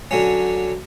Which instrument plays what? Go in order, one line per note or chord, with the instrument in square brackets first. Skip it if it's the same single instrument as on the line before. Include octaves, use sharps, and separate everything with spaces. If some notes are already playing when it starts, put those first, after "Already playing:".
[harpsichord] D3 F#3 C#4